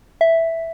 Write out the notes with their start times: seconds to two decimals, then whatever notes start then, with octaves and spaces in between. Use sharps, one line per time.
0.21 E5